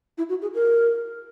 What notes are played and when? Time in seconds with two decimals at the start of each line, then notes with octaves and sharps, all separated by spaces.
0.18 E4
0.29 F#4
0.42 G#4
0.55 A#4